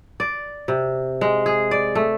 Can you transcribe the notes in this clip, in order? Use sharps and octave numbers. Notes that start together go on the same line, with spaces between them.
D5
C3
G#3
G#4
D5
A3